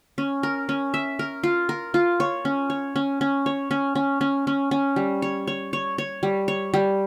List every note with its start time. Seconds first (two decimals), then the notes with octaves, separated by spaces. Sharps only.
0.18 C#4
0.43 A#4
0.69 C#4
0.94 E5
1.19 A#4
1.43 F4
1.69 A#4
1.94 F4
2.20 C#5
2.45 C#4
2.70 C#5
2.96 C#4
3.21 C#4
3.46 C#5
3.71 C#4
3.95 C#4
4.21 C#4
4.47 C#4
4.71 C#4
4.96 G3
5.22 C#5
5.47 C#5
5.73 C#5
5.98 C#5
6.23 G3
6.48 C#5
6.74 G3